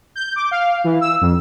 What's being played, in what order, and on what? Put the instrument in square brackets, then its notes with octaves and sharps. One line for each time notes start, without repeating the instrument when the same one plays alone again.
[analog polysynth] G6
D6
F5
E3
E6
F2